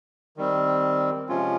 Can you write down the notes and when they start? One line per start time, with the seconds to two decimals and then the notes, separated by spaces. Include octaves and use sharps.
0.37 D#3 G3 C4
1.29 C3 F3 G#3 C#4 F4